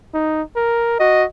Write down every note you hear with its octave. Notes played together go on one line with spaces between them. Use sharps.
D#4
A#4
F#4 D#5